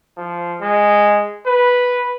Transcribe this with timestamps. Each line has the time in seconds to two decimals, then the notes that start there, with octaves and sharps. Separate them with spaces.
0.18 F3
0.62 G#3
1.47 B4